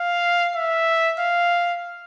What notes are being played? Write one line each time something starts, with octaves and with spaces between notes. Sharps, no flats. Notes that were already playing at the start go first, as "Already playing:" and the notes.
Already playing: F5
E5
F5